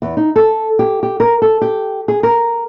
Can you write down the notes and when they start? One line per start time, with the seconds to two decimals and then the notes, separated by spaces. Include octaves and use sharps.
0.02 E2
0.17 D#4
0.36 A4
0.79 G4
1.03 G4
1.20 A#4
1.42 A4
1.62 G4
2.08 G#4
2.23 A#4